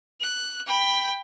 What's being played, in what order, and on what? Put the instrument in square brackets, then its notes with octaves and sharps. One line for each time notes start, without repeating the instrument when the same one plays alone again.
[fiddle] F#6
G5 B5